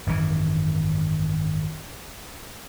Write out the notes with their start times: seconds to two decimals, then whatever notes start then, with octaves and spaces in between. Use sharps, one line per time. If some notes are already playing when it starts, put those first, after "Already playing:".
0.06 G#1 F#2 A#2 E3